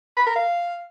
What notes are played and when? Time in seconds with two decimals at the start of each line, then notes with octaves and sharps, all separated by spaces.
0.17 B5
0.26 A#4
0.36 F5